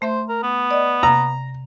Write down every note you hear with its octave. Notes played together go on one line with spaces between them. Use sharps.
A3 C5 E5 C6
A#4
B3
D5 D#5
C3 A#5